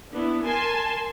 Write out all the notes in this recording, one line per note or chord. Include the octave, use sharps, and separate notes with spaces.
B3 D4 E4
A#4 G#5 A5 C6